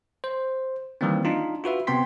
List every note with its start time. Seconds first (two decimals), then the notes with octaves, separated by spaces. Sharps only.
0.24 C5
1.01 D#3 E3 G3 A#3 C4
1.25 D4 D#4 F4
1.64 F4 F#4 B4 E5
1.87 C3 B3 C4 G5 C6 B6